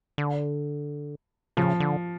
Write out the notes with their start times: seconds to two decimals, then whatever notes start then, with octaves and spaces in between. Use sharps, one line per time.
0.18 D3
1.57 C#3 F3
1.80 D3